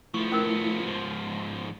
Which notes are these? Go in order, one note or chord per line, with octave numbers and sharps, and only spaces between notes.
F3 A3 B3 E4 C#6
C#4 A#4
G#2 F3 A5 C6